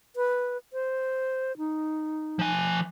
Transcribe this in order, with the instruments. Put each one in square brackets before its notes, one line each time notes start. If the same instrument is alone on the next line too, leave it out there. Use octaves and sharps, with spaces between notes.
[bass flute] B4
C5
D#4
[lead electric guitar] F3 G#5